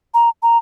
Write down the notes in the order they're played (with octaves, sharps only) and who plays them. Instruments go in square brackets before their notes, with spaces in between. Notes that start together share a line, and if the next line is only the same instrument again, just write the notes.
[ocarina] A#5
A#5